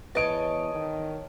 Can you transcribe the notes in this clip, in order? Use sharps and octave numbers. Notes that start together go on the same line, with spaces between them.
E2 B4 C#5 D#5 A5 D7
D#3